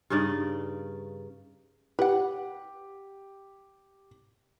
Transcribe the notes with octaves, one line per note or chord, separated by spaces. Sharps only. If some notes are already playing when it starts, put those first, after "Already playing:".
G2 C#3 D#4 D5
G4 B4 F#5